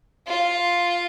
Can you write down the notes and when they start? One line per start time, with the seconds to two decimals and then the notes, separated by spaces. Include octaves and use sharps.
0.27 F4